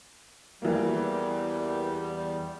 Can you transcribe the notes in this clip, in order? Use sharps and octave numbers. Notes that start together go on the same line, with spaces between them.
E2 E3 G3 A#3